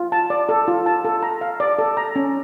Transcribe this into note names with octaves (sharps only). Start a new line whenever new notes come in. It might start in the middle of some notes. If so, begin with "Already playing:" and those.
Already playing: F4
A5
D5
A4
F4
A5
A4
A#5
F5
D5
A4
A#5
C#4